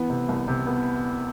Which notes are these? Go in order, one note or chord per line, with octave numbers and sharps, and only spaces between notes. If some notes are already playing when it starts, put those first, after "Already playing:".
Already playing: E3 B3
C3
C2
C3
B3